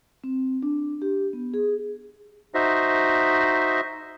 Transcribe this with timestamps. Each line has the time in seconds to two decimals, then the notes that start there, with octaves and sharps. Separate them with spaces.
0.24 C4
0.62 D4
1.02 G4
1.33 B3
1.54 G#4
2.54 D#4 F#4 C5 D#5 E5